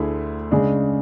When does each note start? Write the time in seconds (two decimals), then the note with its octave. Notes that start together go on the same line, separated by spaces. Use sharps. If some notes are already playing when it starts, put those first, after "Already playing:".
Already playing: D2 D3 A3 E4 G#4
0.51 C#3 G#3 D4